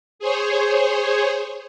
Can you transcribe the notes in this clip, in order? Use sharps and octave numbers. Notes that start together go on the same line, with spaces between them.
G#4 C5 C#5